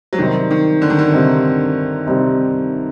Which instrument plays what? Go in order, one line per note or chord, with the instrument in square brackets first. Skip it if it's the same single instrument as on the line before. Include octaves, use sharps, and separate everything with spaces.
[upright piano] F#3
[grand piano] C3 G3 C4 D#4 [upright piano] D#3
[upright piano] D#3
D3
D#3
D3
[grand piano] C3 G3 C4 D#4
C3 G3 C4 D#4